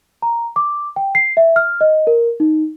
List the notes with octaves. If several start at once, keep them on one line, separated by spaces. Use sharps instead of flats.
A#5
D6
G5
C7
E5
F6
D#5
A#4
D#4